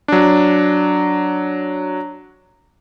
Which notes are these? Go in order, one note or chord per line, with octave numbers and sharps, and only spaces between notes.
F#3 D4